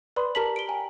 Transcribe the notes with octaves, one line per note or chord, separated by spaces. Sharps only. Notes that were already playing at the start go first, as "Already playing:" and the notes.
B4 D5 B5 C6 D#6
G4 A#4 A5 A#5 B6 F#7
D7 G7
G5 G#5 A#5